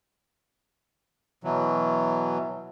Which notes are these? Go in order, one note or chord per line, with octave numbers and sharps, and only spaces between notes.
B2 E3 F#3